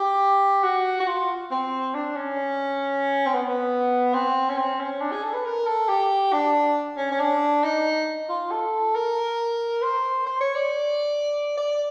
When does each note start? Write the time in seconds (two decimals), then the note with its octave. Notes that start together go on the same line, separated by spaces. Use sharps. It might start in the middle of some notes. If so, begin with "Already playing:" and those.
Already playing: G4
0.63 F#4
1.00 F#4
1.08 F4
1.51 C4
1.94 D4
2.16 C#4
3.26 C4
3.33 B3
3.48 B3
4.14 C4
4.49 C#4
4.57 C4
4.80 C#4
5.01 D4
5.12 G#4
5.23 A4
5.34 B4
5.45 A#4
5.67 A4
5.88 G4
6.32 D4
6.97 C#4
7.11 C#4
7.20 D4
7.64 D#4
8.29 F4
8.51 A4
8.95 A#4
9.82 C5
10.26 C5
10.40 C#5
10.55 D5
11.57 D5